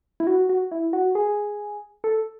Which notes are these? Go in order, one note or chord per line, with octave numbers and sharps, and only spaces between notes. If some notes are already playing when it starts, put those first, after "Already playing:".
E4
F#4
F#4
E4
F#4
G#4
A4